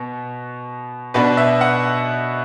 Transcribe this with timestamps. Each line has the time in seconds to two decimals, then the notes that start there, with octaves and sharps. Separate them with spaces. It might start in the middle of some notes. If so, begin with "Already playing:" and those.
Already playing: B2 B3
1.14 B2 B3 D4 B4
1.37 E5
1.61 F#5